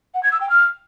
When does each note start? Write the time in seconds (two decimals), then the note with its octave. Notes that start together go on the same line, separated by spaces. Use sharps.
0.14 F#5
0.23 G#6
0.31 E6
0.40 G5
0.49 F6